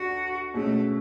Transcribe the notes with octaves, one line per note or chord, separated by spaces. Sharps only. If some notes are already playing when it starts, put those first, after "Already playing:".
Already playing: D2 D4 F#4
B2 G#3 A3 C#4